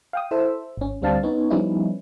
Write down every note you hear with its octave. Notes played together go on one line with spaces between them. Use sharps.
F5 G5 D#6
E4 A4 C5 E5 E6
G#1 C#4
D2 G3 C4 D4 F5 A5
B3 C#4 D#4 C#5
F3 G3 B3 C#4 D#4 E4